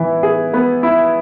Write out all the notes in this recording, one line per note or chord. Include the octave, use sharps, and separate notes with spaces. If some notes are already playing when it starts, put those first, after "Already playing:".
Already playing: E3 B3 E4
G#4
B3
E4